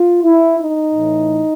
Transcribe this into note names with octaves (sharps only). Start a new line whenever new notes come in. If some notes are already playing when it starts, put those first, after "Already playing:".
Already playing: F4
E4
D#4
A2 E3